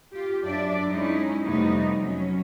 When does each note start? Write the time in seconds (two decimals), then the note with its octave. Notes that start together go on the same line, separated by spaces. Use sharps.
0.13 F4 G4
0.43 F#2 D4 D5 E5
0.89 G#3 C#4 D#4 E4
1.42 F2 C3 G3 A3 B3 D#4
1.98 F#3 C#4